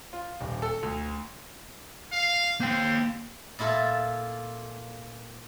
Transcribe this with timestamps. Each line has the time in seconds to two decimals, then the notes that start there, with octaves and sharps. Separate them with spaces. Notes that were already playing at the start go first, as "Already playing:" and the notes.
0.13 F4
0.41 D#1
0.62 A4
0.83 D2
2.12 F5
2.60 A#3 C5 G5
3.59 A#2 E4 F4 A4